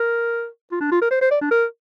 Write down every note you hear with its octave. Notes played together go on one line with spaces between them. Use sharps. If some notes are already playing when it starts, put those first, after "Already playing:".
Already playing: A#4
F4
D4
F4
A#4
C5
C5
D5
D4
A#4